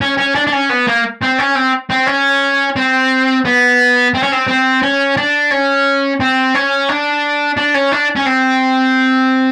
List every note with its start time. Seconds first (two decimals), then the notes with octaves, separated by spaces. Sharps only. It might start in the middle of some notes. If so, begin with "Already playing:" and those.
0.01 C#4
0.18 C#4
0.35 D4
0.47 D4
0.53 C#4
0.70 B3
0.87 A#3
1.22 C4
1.39 C#4
1.55 C4
1.90 C4
2.07 C#4
2.76 C4
3.45 B3
4.14 C4
4.23 C#4
4.32 C4
4.48 C4
4.82 C#4
5.17 D4
5.51 C#4
6.20 C4
6.54 C#4
6.89 D4
7.57 D4
7.75 C#4
7.92 D4
8.16 C#4
8.26 C4